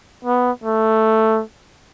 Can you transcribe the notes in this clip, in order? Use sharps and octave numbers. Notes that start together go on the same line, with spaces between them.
B3
A3